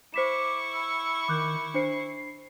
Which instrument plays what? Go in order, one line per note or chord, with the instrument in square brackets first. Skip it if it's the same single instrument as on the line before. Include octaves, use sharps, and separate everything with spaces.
[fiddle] E4 C#6 [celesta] C5 B6 E7 [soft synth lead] D6
[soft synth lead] E6
[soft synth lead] D#3 [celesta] D6 F#6 G6
[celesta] D4 C5 C#7 [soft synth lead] C7